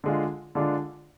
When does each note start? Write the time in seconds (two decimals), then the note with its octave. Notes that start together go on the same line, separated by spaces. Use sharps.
0.04 D3 G#3 D4 F4
0.55 D3 G#3 D4 F4